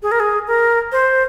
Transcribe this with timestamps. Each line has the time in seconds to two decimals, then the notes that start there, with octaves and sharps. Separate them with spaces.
0.03 G#4
0.12 A#4
0.20 G#4
0.48 A#4
0.92 C5